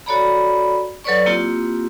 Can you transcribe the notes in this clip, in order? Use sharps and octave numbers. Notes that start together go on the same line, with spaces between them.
F#4 A4 C#5 D5 A#5 B5
F#3 A4 B4 C#5 D5 C#6
A#3 C4 E4 F4 G4